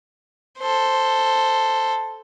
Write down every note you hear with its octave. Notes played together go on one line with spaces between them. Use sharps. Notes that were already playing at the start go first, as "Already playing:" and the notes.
A4 C5